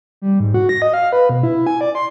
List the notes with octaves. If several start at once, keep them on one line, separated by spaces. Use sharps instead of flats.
G3
G#2
F#4
A#6
D#5
F5
B4
B2
E4
G#5
D5
C6